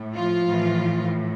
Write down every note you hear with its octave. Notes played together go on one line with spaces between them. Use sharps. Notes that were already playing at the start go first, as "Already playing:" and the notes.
Already playing: A2
F3 F4
A2 E3